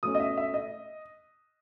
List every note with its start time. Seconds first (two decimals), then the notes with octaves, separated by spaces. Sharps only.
0.03 B2 A3 C#4 D#6
0.15 D#5
0.20 E5
0.37 E5
0.54 D#5